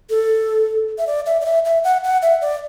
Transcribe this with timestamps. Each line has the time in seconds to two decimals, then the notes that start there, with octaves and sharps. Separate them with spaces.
0.10 A4
0.98 E5
1.07 D5
1.26 E5
1.41 D5
1.46 E5
1.65 E5
1.84 F#5
2.04 F#5
2.22 E5
2.42 D5